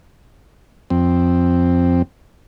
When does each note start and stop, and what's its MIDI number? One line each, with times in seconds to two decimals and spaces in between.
0.90 2.02 41
0.90 2.02 60